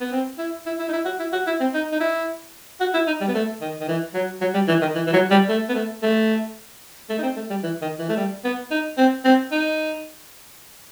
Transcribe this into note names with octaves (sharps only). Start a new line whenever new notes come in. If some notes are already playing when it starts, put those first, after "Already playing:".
B3
C4
E4
E4
E4
D#4
E4
F#4
E4
F#4
E4
C4
D#4
D#4
E4
F#4
E4
D#4
G3
B3
A3
D#3
D#3
E3
F#3
F#3
G3
E3
D#3
E3
E3
F#3
G3
A3
B3
A3
A3
A3
D#4
C4
A3
G3
E3
D#3
E3
A3
G3
B3
D#4
C4
C4
D#4